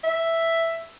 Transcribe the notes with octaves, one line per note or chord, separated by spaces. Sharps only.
E5